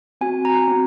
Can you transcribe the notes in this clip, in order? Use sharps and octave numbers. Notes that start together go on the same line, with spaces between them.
C4 F#4 G#5
A#5
C4 F#4